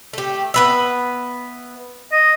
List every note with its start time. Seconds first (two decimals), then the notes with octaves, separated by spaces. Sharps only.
0.13 A3 G4
0.54 B3 B4 E5
2.12 D#5